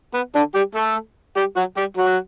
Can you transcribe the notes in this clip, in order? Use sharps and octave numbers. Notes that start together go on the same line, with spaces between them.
B3
D3 D4
G3 G4
A3 A4
G3 G4
F#3 F#4
G3 G4
F#3 F#4